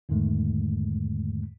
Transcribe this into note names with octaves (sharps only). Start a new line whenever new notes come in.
E2 G#2 D3 D#3 G#3 A3